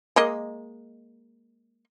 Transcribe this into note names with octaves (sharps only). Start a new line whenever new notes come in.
G#3 A#3 D#5